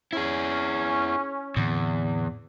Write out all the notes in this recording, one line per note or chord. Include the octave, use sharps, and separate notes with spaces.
C#4 E4 G#4
E2 A2 D3 C4